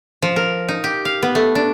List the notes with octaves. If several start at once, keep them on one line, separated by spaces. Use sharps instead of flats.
F3
A#4
D#4
G4
F5
B3
A3
D4